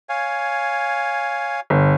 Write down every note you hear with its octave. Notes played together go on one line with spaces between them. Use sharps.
C#5 F5 G#5
G1